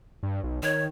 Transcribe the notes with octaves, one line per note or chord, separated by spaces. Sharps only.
G2
B1
D#3 C#5